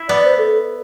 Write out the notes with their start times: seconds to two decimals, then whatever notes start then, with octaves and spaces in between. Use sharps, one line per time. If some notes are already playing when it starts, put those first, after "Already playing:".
Already playing: E4
0.09 B3 D5
0.25 C5
0.38 A4